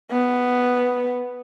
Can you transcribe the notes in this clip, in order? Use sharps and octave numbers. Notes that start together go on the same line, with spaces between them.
B3